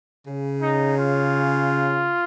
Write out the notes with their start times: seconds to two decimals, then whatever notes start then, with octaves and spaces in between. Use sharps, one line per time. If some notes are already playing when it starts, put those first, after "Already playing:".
0.27 C#3
0.62 D#4
0.98 F4